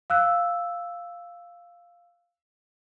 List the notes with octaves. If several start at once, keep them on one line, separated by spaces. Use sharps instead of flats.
F5 E6 F#6